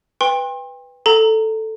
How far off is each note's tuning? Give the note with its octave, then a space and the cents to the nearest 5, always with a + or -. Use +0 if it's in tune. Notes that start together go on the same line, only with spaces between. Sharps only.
B4 +0 G5 +30 C6 +35
A4 +0 A#5 -15